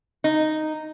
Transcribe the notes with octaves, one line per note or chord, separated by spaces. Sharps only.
D#4